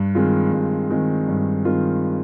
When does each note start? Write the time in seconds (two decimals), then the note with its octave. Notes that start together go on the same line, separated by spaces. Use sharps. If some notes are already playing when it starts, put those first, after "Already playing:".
Already playing: G2
0.15 D#3 G#3 C4 F4
0.53 G2
0.90 D#3 G#3 C4 F4
1.28 G2
1.65 D#3 G#3 C4 F4